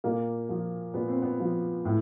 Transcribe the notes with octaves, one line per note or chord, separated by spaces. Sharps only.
A#2 A#3
F3
A#2 B3
C4
B3
F3
A2